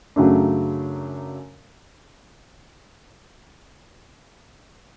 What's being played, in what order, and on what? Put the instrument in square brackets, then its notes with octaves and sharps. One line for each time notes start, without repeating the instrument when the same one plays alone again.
[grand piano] F#2 C#3 F#3 A3 D4